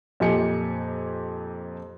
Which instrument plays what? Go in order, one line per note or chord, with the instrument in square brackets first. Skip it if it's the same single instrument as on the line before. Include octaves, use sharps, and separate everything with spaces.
[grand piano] F2 A#2 G4 D#5 G#5 C#7